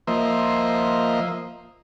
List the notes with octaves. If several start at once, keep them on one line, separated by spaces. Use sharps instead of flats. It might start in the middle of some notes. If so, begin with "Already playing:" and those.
F3 A#3 C5 D#5 E5